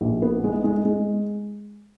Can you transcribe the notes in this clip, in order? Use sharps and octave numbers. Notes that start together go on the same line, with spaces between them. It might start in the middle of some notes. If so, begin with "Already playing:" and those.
A#1
B3
G#3
G#3
G#3